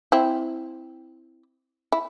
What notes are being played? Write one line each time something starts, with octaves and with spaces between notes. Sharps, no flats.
C4 E4
E4